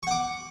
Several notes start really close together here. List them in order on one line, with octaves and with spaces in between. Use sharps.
C#6 F#5 D6